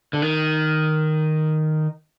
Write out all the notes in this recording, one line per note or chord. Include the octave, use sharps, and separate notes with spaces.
D3
D#3